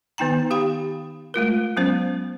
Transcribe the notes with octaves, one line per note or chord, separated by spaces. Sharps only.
D#3 B3 D#4 G5 A#5
G4 F5 G5 B5
G#3 A3 F4 A#4
F#3 G#3 B3 C#4 C5